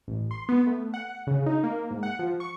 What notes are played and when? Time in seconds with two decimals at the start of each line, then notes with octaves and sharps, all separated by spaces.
0.08 A1
0.31 C6
0.49 B3
0.67 A3
0.94 F#5
1.27 C#3
1.46 D#4
1.64 A#3
1.91 G#2
2.03 F#5
2.19 F3
2.40 C#6